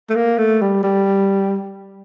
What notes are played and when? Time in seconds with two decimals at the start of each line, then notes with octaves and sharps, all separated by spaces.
0.10 A3
0.15 A#3
0.38 A3
0.61 G3
0.83 G3